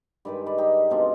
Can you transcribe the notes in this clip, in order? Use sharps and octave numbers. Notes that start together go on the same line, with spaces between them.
G2 D#3 G#3 B4 D5
B4 D5
D#4 G4
B2 G#3 C4 D4 F4